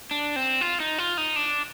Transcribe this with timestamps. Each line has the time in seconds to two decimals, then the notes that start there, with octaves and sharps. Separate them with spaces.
0.11 D4
0.36 C4
0.61 F4
0.80 D#4
0.99 F4
1.18 D#4
1.36 D4